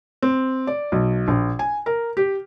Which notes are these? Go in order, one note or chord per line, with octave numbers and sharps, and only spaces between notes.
C4
D5
B1
A#1
G#5
A#4
G4